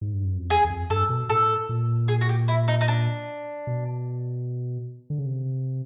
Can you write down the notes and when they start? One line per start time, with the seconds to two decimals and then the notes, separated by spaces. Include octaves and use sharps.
0.01 G#2
0.14 G2
0.25 F#2
0.38 F2
0.50 E2 G#4
0.64 E2
0.70 F2
0.90 G2 A4
1.09 B2
1.29 A2 A4
1.69 A#2
2.08 G#4
2.21 F#4
2.29 G4
2.48 E4
2.68 D#4
2.81 D#4
2.88 D4
3.67 B2
5.10 D3
5.18 C#3
5.26 C3